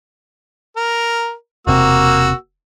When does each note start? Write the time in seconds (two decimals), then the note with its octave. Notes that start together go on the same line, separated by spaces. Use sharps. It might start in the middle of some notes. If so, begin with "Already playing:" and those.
0.76 A#4
1.67 E1 C3 A#3 F#4 E6